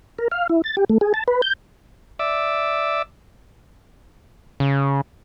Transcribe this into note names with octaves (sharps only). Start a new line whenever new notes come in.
A#4
F5
E4
A6
G4
A3
G#4
A5
B4
G6
D5 E5 D6 E6
C#3